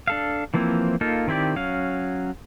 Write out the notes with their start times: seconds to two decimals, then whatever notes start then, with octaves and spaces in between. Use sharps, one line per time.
0.08 D4 A4 F5
0.54 E3 F3 A#3 C4 E4
1.01 A#3 D#4 F4 A4
1.27 D#3 C4 E4 G4 D5
1.56 F#3 C#4 F5